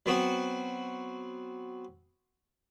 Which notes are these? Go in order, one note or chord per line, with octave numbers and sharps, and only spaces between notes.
F#3 B3 C4 F#4